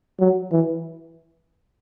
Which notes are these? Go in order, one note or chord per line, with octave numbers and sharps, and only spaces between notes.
F#3
E3